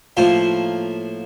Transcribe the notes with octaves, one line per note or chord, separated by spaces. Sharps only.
A2 F3 A#3 F4 C5